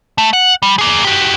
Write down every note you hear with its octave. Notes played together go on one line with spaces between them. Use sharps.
A3
F#5
G3
A#3 G#4
F#4 G4